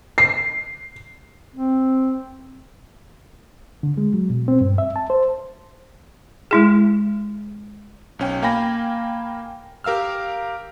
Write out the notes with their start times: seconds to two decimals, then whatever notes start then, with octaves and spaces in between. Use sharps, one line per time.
0.18 C7
1.56 C4
3.83 D3
3.97 G#3
4.14 F#3
4.30 B2
4.48 C4
4.61 G2
4.78 E5
4.96 A5
5.10 C5
6.51 G#3 E4 G#4
8.19 B1 C#4 G5
8.42 A#3 F5 G5 G#5 B5 A#6
9.84 G4 A#4 F5 E6 F6